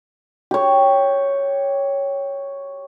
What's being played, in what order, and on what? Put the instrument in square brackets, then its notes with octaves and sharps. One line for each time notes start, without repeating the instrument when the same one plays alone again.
[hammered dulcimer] G4 C#5